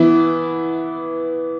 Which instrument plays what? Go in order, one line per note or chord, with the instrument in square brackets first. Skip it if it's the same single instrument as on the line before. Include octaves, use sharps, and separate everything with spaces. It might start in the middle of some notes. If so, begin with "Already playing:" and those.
Already playing: [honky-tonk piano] E3 B3 E4